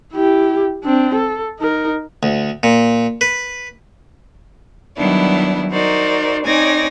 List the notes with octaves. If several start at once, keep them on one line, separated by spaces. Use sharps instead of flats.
E4 G4
C4 D4
A4
D#4 A#4
D2
A#2
B4
D#3 F#3 G3 B3 D4 E4
D#4 F#4 A#4 C5 D5
C4 D#4 C#5 D5 G#5 A#6